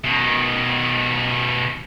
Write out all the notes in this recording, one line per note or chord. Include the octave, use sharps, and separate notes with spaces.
B2 D#3